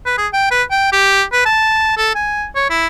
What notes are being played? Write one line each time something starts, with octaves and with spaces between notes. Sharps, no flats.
B4
G#4
G5
B4
G5
G4
B4
A5
A4
G#5
C#5
E4